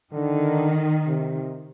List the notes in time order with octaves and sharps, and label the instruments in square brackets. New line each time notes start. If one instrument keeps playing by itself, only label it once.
[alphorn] D3 [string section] D#3
[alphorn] C3